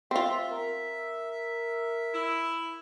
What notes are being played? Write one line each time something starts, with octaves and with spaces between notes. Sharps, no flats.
C4 F4 E5
A#4
E4